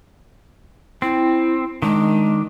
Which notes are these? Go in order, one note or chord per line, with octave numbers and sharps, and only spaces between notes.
C4 E4
D#3 G#3 D4